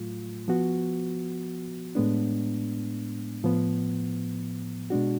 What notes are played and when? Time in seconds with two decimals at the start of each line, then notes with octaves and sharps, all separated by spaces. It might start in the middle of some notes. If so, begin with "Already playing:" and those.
Already playing: A2 F#3 A3 F4
0.48 F3 B3 F#4
1.95 A2 G#3 B3 D4
3.43 A2 F3 B3
4.90 B2 G#3 D4 F#4